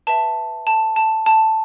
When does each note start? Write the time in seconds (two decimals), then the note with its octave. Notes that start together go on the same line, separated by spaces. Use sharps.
0.07 B4 E5 A5
0.67 A5
0.96 A5
1.26 A5